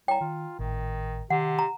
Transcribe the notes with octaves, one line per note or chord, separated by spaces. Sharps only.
C2 C#5 G5 A#5
D#3 F4
G#1 A2 D#3
C3 D#3 F#5
A#5